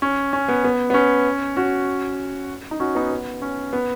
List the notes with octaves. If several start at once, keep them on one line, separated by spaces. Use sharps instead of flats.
C#4
C#4
B3
B3
B3
C#4
C#4 F#4
D#4
C#4 F#4
B3 D#4
B3
C#4
B3